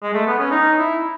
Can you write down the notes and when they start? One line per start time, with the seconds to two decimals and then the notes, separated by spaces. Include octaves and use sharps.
0.02 G#3
0.14 A3
0.26 B3
0.39 C#4
0.51 D#4
0.78 E4